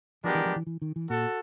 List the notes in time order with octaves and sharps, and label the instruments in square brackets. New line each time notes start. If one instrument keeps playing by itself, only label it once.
[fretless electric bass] F3 [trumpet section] G#3 B3 D4 G4 A#4
[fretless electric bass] E3
F3
E3
E3
D#3
E3
[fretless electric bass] A#2 [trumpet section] F#4 A4